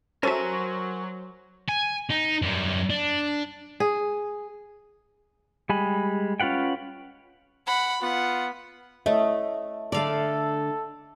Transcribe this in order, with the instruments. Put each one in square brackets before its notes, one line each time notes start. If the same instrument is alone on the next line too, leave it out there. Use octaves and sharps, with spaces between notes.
[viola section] F#3 [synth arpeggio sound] C#4 A4 E5 [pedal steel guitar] A#4 G#5 C#6 [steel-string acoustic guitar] C5
[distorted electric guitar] G#5
D#4
F#2 G3
D4
[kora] G#4
[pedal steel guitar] G3 G#3 G#5 B5
C#4 F4 B4 F#5 G5
[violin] F#5 B5
[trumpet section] B3 F4 [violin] F#5
[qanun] A3 [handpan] C#5 D#5 E5
[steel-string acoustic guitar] D3 A3 [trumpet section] A4 [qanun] D5 F5